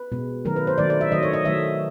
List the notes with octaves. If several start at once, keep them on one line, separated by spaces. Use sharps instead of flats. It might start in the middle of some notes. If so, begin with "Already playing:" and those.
Already playing: B4
B2 G#3
D#3 F#3 A3 A#4
B4
C5
D#3 F#3 A3 D5
D5
E5
D#3 F#3 A3 D#5
C#5
D#5
D#3 F#3 A3 E5